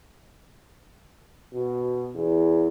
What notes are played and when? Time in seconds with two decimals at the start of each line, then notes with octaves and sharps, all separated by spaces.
1.53 B2
2.15 E2